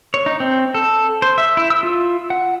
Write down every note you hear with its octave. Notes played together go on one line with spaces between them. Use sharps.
C#5
D#4
C4
A4
C5
E5
E4
E6
F4
F#5